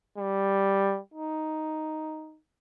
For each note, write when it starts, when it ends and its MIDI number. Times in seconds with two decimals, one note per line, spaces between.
0.18 1.00 55
1.14 2.38 63